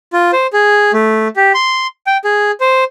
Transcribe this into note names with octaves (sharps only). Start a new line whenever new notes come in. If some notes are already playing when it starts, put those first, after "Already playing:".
F4
C5
G#4
A3
G4
C6
G5
G#4
C5